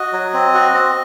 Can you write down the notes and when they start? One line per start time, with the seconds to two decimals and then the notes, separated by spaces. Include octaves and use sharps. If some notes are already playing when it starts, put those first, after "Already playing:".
Already playing: F#4 D#5
0.13 F#3
0.34 C4
0.54 F#4
0.74 C4